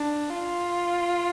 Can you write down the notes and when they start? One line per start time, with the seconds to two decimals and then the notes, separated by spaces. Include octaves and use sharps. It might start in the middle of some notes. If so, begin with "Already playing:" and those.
Already playing: D4
0.30 F4